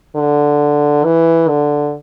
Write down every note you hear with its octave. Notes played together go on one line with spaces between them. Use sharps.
D3
E3
D3